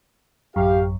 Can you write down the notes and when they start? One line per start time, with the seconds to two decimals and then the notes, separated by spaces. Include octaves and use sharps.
0.56 A1 F#2 G4 F5